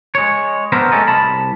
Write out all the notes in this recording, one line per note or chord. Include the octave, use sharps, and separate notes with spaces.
G#3 C#5
B3 C4 D4 E4 A#4 C5
G#3 A3 C#4 A4 A#4 D#5
C2 A5 B5